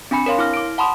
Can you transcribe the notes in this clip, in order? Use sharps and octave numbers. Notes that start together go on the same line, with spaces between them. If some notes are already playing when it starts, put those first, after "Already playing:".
C4 D4 G#5 B5 C#7
A#4 C#5 F5 C6
E4 D6 F6 A#6
D6 D7
F#5 A5 B5 C6 D#6